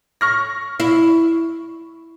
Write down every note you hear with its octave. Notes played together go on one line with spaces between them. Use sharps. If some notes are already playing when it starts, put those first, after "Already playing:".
C#6 F6 A#6
E4